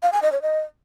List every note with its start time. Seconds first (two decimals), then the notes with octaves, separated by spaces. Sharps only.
0.03 F5
0.13 G#5
0.22 D#5
0.32 C#5
0.42 D#5